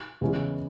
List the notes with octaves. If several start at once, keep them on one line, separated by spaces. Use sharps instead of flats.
E2 C#3 E3 G#3 C#4